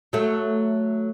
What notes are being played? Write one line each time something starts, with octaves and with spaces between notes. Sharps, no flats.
F#3 A3